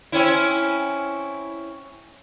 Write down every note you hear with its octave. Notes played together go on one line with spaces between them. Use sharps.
C4 C#4 E4